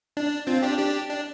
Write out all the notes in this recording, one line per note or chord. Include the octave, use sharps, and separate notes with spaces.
D4
C4 F4
D4 G4
D4 G4
D4